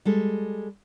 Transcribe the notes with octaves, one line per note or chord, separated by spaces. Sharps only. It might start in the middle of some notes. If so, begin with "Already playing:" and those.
G3 G#3 A4